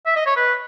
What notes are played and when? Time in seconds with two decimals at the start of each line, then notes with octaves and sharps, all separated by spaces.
0.06 E5
0.16 D#5
0.26 C#5
0.36 B4